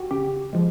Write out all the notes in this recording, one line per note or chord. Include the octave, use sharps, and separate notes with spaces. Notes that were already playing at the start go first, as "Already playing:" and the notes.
Already playing: F#4 G4
C#3 G4
F3 G#3